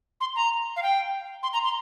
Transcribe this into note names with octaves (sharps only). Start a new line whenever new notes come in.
C6
A#5
F5
G5
C6
A#5
C6